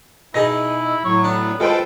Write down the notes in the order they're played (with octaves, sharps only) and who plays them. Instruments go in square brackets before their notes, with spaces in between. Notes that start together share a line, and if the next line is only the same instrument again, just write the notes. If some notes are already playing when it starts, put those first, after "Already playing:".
[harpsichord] B2 D#4 G#4 [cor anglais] E4 [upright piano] A#6
[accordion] A2 F#3 [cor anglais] C#5
[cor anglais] B3 [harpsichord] D4
[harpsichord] G#3 [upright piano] F4 B4 C5 [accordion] A4 G5